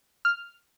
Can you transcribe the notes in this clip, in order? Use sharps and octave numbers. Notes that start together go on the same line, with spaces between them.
F6